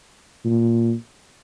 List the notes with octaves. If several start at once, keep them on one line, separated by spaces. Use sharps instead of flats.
A#2